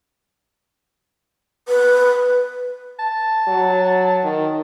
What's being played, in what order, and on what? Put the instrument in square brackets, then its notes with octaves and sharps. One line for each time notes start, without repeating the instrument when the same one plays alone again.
[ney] B4
[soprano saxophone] A5
[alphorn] F#3
D#3